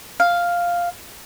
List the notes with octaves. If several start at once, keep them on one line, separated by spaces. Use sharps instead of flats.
F5